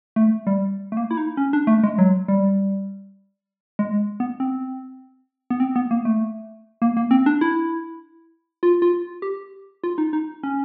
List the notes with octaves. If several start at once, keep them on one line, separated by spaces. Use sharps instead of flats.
A3
G3
A3
A#3
E4
D#4
C#4
D4
A3
G#3
F#3
G3
G#3
B3
C4
B3
C4
B3
A#3
A3
A#3
A#3
C4
D4
E4
F4
F4
G4
F4
D#4
D#4
C#4